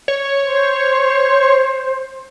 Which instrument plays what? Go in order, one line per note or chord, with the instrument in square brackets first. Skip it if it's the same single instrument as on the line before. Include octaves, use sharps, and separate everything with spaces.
[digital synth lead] C#5
[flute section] C5